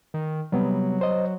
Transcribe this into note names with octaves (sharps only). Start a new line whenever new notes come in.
D#3
C3 F#3 G3 B3
C5 D#5